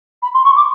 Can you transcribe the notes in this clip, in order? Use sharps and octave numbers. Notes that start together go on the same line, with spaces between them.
B5
C6
C#6
D6